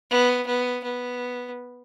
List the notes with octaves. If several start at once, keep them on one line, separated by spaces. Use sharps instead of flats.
B3
B3
B3